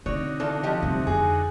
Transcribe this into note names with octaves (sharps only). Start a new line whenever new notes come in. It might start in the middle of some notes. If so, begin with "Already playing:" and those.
B2 D3 C4 D#4 F#4 C#5 D5
E3 D4 F4 A4
F3 F4 G4 D#5
G2 C3 E3
F2 G#4